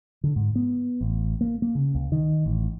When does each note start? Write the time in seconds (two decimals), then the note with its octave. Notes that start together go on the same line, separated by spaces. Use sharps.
0.24 D3
0.36 G#2
0.56 B3
1.01 A1
1.41 A#3
1.62 A#3
1.75 C#3
1.95 C#2
2.12 D#3
2.46 A1